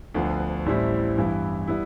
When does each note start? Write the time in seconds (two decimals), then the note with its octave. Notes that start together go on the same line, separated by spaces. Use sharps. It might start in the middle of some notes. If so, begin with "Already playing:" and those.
0.14 D2 D3 F3 B3
0.66 A1 A2 G3 C4 E4
1.17 G2 E3 B3 E4
1.68 G3 B3 E4